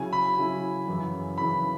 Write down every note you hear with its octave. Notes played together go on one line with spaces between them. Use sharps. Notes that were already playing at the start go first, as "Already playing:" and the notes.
Already playing: C#3 F#3 C#4 E4 G#5
B5
C#3 F#3 C#4 E4
F#2 C#3 E3
F#2 C#3 E3 B5